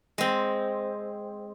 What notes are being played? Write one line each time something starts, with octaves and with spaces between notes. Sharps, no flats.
G#3 C4